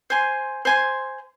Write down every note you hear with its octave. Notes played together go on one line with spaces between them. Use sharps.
C5 G#5 C6
C5 G#5 C6